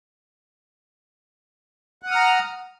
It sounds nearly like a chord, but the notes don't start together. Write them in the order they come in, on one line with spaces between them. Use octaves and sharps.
F#5 D#6 F6 A#5